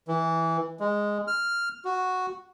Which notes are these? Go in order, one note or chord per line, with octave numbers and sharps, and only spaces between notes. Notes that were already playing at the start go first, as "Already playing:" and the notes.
E3
G#3
F6
F#4